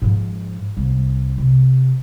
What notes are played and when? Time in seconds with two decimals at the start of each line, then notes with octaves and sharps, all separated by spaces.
0.02 G#2 F3
0.77 C2
1.38 C3